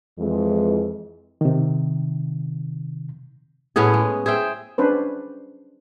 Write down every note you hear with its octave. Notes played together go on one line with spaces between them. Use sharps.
F2 E3 G#3
C3 D#3
A2 B3 C#4 G#4
G#3
G#4 C5 E5 G5
C#4 D4 B4 C5